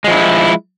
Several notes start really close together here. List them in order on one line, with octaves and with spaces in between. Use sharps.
G#3 F3 E4